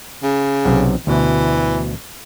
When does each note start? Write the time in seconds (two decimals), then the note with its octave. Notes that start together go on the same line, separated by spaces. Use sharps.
0.23 C#3
0.64 B1 C3 F#5
1.07 D2 B2 E3